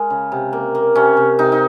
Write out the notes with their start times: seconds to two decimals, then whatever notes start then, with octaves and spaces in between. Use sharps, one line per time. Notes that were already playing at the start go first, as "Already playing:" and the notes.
Already playing: G#3 A#4
0.10 C#3
0.32 C3
0.53 A#3
0.75 A#3
0.95 C3 C#4
1.17 C3
1.39 C3 D#4
1.52 D#4